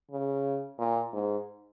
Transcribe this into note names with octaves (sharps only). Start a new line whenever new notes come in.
C#3
A#2
G#2